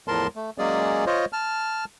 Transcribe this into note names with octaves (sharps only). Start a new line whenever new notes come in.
E2 A2 F3 A#4 A5 C6
A3
F#3 G#3 A#3 C#4 G#4 D5
F4 C5 C#5 D#5
A5 F6